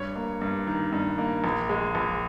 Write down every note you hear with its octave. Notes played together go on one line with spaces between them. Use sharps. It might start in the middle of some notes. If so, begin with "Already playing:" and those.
Already playing: G2 C#5
A#3
G2
D#3
G2
A#3
A#1
G#3
A#1